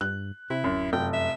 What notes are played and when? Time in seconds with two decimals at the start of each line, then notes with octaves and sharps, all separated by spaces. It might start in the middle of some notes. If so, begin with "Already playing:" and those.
0.01 G2 F#6
0.50 C3 E4
0.64 D1 F#2
0.93 F1 F#2 G5
1.13 E5